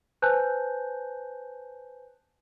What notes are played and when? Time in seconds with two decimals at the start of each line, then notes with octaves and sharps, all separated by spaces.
0.22 B4 C5 G#5 A5 F#6 G6